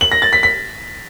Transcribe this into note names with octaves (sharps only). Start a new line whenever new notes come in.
F#7
A#6
A6
B6
B6